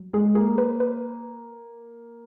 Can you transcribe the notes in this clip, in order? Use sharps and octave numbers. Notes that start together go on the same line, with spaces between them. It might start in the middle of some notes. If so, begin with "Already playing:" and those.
Already playing: F#3
G#3 G#4
A#3 G#4
B4
B4